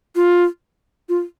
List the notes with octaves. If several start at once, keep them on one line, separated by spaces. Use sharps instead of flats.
F4
F4